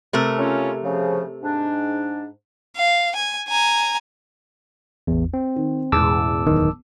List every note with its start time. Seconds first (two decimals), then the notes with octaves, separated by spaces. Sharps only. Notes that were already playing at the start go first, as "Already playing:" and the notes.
0.13 C3 A3 A#4
0.38 C#3 C#4 F4
0.83 C#3 F3
1.42 G#2 D4
2.77 F5
3.16 G#5
3.48 G#5 A#5
5.07 A1 E2
5.34 C4
5.56 D#3
5.92 E1 A1 E2 G#3 A5 D6 E6
6.47 D1 D#3